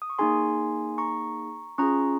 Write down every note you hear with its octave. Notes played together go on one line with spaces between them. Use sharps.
D#6
C#6
A#3 D#4 G#4 G#5 C6
A#5 C#6
C#4 F4 G#4 A#5 C#6